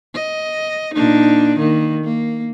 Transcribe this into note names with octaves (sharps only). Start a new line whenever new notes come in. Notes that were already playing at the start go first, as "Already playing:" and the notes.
D#5
A#2 D4 D#4
D#3 A#3
A#3